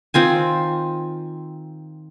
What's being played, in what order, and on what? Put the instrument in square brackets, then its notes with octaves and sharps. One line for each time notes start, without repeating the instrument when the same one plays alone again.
[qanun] D#3 C4 F4 G#5